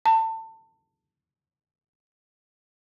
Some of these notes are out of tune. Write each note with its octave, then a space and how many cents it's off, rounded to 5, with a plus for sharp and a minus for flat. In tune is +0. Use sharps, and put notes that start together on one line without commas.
A5 +25